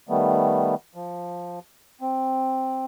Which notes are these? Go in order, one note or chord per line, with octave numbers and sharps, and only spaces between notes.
D#3 G3 A3 B3
F3
C4